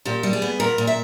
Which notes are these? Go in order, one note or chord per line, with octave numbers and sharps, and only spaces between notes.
A#2 G4
G3
G#4
B3
A#2 A#4
A#2
E5